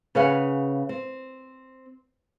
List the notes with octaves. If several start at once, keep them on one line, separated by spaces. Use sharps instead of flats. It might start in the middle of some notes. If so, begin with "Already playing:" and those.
C#3 G#4 B4 C#5 F5 F#5
C4